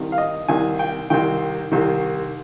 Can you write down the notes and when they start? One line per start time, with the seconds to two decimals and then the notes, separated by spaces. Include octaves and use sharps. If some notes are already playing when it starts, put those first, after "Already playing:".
Already playing: C2 C3 D#3
0.12 F5
0.18 D#5
0.48 C2 C3 D#3 G#5
0.79 G5
1.10 C2 C3 D#3 G5
1.72 C2 C3 D#3